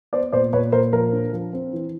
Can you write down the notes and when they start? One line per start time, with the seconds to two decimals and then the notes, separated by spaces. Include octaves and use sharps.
0.13 B3 C5 D5
0.33 A#2 C5 D5
0.53 A#2 B4 C#5
0.72 A#2 A#4 C5
0.92 F3 A#4
1.13 D4
1.33 F3
1.53 C4
1.73 E3